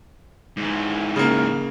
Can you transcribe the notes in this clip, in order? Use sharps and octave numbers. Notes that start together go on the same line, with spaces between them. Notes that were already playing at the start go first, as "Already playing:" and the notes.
G#2 E3
C#3 A#3